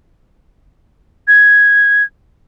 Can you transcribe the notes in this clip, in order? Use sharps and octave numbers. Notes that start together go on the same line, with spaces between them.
G#6